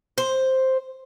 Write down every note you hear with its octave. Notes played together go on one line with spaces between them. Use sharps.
C5